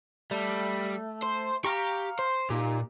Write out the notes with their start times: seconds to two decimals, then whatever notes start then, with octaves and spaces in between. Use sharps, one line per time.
0.31 G3 A3
1.22 C5
1.64 G4 F5 A#5 C#6
2.19 C5
2.50 A#2 D#4 G4